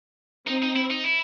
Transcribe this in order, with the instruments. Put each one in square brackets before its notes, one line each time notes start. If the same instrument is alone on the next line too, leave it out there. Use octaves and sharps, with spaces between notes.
[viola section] C4 [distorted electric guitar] D#4
[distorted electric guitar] D#4
E4
D#4
E4